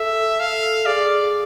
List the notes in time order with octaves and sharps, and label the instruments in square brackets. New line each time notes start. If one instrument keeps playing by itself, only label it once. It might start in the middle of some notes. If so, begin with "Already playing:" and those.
Already playing: [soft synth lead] A4 [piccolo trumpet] E5
[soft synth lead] A4 [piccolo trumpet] F5
[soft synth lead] G#4 [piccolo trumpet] D5